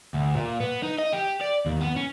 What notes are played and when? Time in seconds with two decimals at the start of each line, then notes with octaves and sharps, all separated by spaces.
0.14 D2
0.35 A#2
0.60 B3
0.83 D#4
0.99 D#5
1.13 G4
1.41 D5
1.66 D#2
1.81 B3
1.97 C#4